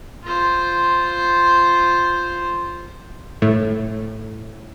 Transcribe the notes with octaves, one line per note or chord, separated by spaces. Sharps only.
F4 C5
A2